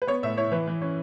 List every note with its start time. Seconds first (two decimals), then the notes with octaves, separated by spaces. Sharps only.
0.02 B4
0.07 B3 C#5
0.23 A2 E5
0.37 E4 C#5
0.52 E3 B4
0.67 E3
0.82 C#4